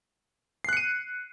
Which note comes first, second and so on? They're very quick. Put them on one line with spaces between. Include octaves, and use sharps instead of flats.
C7 F#6 C#7 D#7